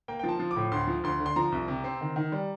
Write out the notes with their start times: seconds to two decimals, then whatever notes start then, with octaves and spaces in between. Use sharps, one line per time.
0.08 A#3 G5
0.19 F3 G5
0.29 A5
0.40 F3
0.51 D6
0.56 A2
0.71 D2 C6
0.87 F3
1.03 D2 C6
1.20 D3
1.26 C6
1.36 F3 A#5
1.52 C2
1.68 C3
1.84 C4
2.01 D#3
2.16 D#3
2.32 G3